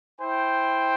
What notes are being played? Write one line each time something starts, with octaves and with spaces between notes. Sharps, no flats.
E4 C5 G5